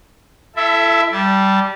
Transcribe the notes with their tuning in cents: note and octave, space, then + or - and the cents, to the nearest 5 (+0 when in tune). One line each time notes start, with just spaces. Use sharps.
E4 +30 A4 +0 E5 +0
G3 -15 A5 +0